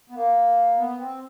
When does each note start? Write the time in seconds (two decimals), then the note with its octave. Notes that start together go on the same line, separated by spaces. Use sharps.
0.10 B3
0.15 A#3
0.77 B3
0.98 C4